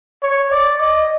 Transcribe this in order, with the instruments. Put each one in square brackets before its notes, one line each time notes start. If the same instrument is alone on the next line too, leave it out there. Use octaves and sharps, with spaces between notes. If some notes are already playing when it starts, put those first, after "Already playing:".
[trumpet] C#5
D5
D#5